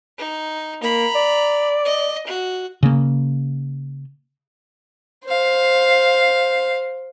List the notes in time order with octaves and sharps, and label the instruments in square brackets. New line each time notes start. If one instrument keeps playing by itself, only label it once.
[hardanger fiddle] D#4
[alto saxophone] A#3 [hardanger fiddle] A#5 B5
[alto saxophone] D5
[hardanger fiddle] D#5
F#4
[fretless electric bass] C#3 A#3
[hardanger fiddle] C5 F5